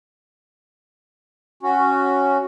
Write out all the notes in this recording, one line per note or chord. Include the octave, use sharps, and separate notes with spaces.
C#4 F#4